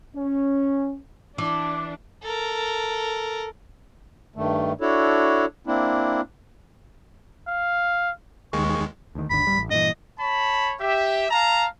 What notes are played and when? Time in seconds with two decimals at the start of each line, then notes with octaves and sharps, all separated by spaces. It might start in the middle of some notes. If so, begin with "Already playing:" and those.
0.15 C#4
1.38 E3 D4 D6
2.23 A4 A#4
4.36 G2 D#3 A3
4.81 D4 E4 F#4 A4 C#5
5.67 A#3 C4 D4 E4
7.47 F5
8.53 D#2 D#3 G#3 C#6
9.15 D2 D#3
9.30 G#1 D#2 D3 B5
9.45 D1 G3
9.58 A1
9.71 G2 A#2 E3 D#5
10.19 C#5 A5 B5
10.81 G4 E5
11.30 F5 A5 A#5